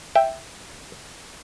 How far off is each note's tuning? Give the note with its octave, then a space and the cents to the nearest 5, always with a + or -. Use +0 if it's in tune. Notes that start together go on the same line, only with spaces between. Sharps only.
E5 +0 G5 +0